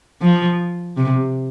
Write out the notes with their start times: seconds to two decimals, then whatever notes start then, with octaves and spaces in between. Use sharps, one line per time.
0.22 F3
0.97 C3